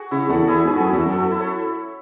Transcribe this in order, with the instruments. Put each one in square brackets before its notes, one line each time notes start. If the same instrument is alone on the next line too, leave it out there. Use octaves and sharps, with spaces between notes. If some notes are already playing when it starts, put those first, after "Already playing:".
Already playing: [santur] F#4 G#4
[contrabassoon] C#3 [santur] E4
[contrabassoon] E2 [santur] F#4 A4
[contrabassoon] E2 [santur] E4 G#4
[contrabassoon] G#2 [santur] G#4 B4
[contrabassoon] F#2 [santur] F#4 A4
[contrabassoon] E2 [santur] F#4 A4
[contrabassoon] F#2
[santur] F#4 A4
E4
A4 C#5